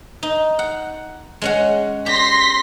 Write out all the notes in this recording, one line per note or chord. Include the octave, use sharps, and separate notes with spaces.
D#4
F#5
G#3 C#4 F#5
G4 C6 A#6 B6